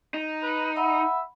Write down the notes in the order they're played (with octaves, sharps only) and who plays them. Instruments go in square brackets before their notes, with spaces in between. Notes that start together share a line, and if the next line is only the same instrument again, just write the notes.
[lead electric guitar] D#4
[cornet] B4
[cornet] E5 [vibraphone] F#5 B5